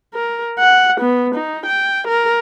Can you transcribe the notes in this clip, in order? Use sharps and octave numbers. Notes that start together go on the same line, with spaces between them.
A#4
F#5
B3
D#4
G5
A#4